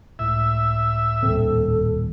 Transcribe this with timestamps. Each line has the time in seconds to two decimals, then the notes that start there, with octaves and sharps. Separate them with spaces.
0.19 C#2 A2 E5
1.23 D#1 C4 A4